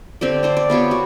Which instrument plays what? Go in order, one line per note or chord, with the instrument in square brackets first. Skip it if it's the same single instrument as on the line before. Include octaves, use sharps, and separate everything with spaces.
[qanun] D3 C4 G4 D5
D4 C5 D5
D5
B3 F4 G4 C#5
F#4